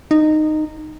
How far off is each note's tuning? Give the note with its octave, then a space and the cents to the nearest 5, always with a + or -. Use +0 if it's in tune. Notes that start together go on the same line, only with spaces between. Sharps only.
D#4 -15